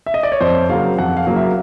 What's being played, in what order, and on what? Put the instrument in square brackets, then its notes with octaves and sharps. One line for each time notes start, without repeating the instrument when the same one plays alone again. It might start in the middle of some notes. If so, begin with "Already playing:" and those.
[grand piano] E5
D#5
D5
C#5
F2 C5
C#3 F#3 A#3 F5
F2 F#5
F5
C#3 F#3 A#3
E5